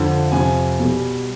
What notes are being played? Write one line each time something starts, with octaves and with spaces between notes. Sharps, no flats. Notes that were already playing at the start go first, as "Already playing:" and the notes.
Already playing: F2 D3 F3
F2 C3 F3 G#5
B2 G3